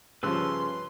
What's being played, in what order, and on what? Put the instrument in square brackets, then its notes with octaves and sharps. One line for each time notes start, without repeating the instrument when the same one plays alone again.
[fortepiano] G2 F3 [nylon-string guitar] C#3 [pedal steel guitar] B4 E6 F#6 [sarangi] C6